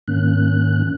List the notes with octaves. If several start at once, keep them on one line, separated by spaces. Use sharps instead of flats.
G#2 D#3 A#3 C#4 F#6